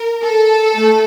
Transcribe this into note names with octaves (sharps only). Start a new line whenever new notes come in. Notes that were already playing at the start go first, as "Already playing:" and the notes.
Already playing: A#4
A4
A3